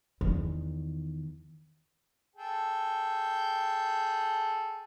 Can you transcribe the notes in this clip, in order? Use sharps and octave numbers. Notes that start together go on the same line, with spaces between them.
E2 D#3
G#4 A4 G5